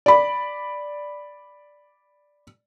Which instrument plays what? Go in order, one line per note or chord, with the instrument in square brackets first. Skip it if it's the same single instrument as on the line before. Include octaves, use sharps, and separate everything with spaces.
[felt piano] D5 B5